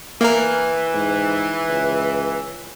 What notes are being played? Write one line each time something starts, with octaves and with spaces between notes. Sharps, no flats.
E3 A#3 A#4
G#2
C#2